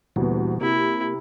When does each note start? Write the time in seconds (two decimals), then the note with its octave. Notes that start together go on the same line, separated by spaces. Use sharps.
0.16 D2 A#2 E3 G3 B3
0.61 C3 A#3 E4